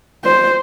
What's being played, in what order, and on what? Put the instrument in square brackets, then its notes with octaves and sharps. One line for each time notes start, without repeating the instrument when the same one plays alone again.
[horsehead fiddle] C5